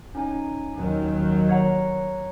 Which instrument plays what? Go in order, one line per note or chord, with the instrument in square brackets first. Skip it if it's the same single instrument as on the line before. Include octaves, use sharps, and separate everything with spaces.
[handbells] C#4 D#4 G#5
[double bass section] D#2 D#3 F#3
[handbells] C#5 F#5 A#5